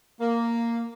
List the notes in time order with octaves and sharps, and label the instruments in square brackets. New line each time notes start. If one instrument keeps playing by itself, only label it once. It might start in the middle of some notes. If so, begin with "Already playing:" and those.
[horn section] A#3